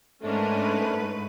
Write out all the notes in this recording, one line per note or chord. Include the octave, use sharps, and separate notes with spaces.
G#2 A3 C#4 D4 A#4 B4